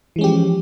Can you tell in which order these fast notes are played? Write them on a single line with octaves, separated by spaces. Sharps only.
E3 G#3 C#4 G4 F3